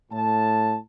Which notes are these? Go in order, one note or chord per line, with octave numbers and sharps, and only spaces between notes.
A2 A5